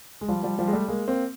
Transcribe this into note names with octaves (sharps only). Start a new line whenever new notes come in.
G#3
F3 G3
F3 G3
F3 G3
G#3
G3 A3
G#3 A#3
A#3 C4